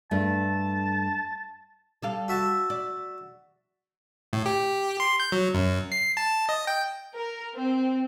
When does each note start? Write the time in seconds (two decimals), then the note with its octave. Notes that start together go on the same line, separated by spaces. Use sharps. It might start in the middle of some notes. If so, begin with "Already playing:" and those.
0.11 G2 A3 A5
2.02 G3 A4 F5
2.28 F#4 E5 A5
2.70 D5
4.33 A2
4.46 G4
5.00 C6
5.20 G6
5.32 F#3
5.54 F#2
5.92 C7
6.17 A5
6.49 D#5
6.67 G5
7.17 A#4
7.57 C4